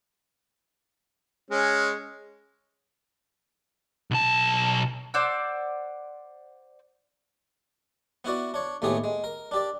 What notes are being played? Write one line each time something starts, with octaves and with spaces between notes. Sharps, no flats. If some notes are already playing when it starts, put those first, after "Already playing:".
G#3 C#4
B1 A5
C5 D5 F#5 E6
B3 E4 F#4 D5
D4 C#5
D#2 A2 A3 B3 G4 G#4
G#3
A#4
D4 G4 D5